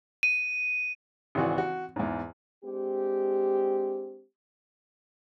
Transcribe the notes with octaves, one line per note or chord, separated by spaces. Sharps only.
D#7
G#1 C#3 E3 F#4 D5
F#4
E2 G#2
G#3 C4 D4 G4